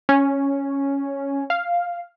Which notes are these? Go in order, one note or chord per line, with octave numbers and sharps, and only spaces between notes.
C#4
F5